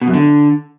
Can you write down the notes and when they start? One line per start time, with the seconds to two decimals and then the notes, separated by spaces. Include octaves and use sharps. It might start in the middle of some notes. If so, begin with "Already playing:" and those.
0.01 B2
0.08 F#2
0.14 D3